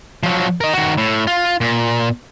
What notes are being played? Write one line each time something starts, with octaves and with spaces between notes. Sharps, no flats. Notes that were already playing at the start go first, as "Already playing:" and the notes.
F3 F#3
A#4 D#5
D#3 F#4
A2
F4
A#2